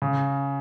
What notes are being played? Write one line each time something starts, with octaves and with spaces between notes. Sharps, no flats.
C#3